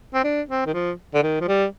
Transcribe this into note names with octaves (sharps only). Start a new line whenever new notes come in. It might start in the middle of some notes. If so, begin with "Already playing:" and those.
C4
D4
C4
D#3
F3
D3
D#3
F3
G3